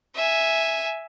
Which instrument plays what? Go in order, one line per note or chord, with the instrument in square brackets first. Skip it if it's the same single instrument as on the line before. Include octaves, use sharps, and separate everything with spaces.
[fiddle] E5 G#5